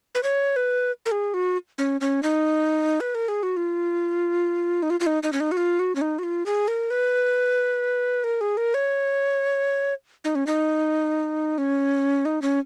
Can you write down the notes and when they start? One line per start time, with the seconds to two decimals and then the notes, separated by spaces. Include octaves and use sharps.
0.15 B4
0.23 C#5
0.56 B4
1.06 A#4
1.12 G#4
1.34 F#4
1.78 C#4
2.01 C#4
2.23 D#4
3.00 B4
3.15 A#4
3.28 G#4
3.43 F#4
3.57 F4
4.83 D#4
4.90 F4
5.00 F4
5.06 D#4
5.23 D#4
5.33 C#4
5.40 D#4
5.52 F#4
5.57 F4
5.79 F#4
5.95 C#4
6.01 D#4
6.19 F#4
6.23 F4
6.46 G#4
6.68 A#4
6.90 B4
8.24 A#4
8.41 G#4
8.57 A#4
8.74 C#5
10.24 D#4
10.35 C#4
10.47 D#4
11.58 C#4
12.25 D#4
12.42 C#4